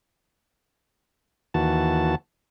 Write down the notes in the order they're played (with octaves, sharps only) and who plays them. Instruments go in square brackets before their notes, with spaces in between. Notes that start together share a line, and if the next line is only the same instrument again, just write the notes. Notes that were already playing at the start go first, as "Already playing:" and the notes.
[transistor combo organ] D#2 E3 F#4 A5